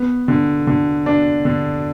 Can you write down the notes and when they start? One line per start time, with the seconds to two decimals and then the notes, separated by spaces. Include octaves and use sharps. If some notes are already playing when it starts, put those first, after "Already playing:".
Already playing: B3
0.28 D3
0.67 D3
1.06 D4
1.45 D3